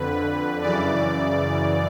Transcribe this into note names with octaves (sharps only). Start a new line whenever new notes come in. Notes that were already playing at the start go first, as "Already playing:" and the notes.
Already playing: F2 D3 B4
F#2 C#3 E3 D5